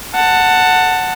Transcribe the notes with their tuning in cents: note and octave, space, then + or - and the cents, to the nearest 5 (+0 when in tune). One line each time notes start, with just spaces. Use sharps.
F#5 +0 A5 +15